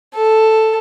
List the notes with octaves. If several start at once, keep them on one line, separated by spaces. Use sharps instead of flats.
A4